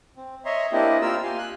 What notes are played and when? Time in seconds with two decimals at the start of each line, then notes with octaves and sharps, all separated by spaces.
0.17 C4
0.45 C#5 D#5 E5 A#5 C6
0.72 A#3 C4 D4 E4 G4 D#5
1.02 A#3 F4 A#4 E6
1.23 G4 F5 G#5 C6
1.38 F#6